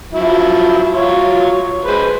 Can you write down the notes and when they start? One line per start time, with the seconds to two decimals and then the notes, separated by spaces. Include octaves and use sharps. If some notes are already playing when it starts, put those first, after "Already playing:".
0.13 F3 F#3 E4
0.92 F#3 F4 C#5
1.85 G#3 B4 C5